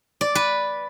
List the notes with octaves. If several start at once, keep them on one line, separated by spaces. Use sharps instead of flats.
D5
B4